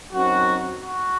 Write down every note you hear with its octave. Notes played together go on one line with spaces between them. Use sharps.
F#2 F#3 C4 D#4 F#4
F#4